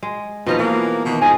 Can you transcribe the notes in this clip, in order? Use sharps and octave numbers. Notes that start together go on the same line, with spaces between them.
G#3
D#2 B2 F3 B3 D#4 F4
E3 A#3
B2 D#3 E3
F2 F3 D#4 G#4 G#5